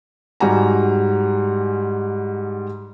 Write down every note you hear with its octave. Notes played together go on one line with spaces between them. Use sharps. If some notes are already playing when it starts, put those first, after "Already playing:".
G#2 G3 F#4 G4 G#5 A#5